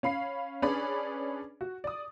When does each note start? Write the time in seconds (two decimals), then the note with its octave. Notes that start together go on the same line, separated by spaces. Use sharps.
0.03 C#4 F5 B5 C7
0.62 C#4 D4 G#4 B4 D5 B5
1.61 F#4
1.84 D5 D#6